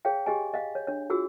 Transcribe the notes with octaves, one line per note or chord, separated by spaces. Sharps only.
G#4 C#5 F5 G5
G4 G#4 D#5 G#5
D#5 F5
C#5
D4 C#5
F4 F#4 G#4 E6